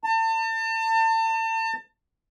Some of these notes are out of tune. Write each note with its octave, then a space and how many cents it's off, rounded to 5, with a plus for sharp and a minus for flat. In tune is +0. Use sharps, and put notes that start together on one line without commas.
A5 +35